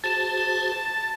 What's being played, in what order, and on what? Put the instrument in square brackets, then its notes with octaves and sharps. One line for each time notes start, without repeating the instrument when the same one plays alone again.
[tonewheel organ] F#4 G#4 C5 [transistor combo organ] A5 [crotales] A6 E7